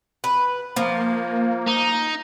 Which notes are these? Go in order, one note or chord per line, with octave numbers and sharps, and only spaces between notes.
B4
F3 A#3
D#4